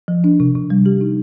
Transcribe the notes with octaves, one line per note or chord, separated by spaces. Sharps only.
F3
D4
C3
C3
G3
G4
D#4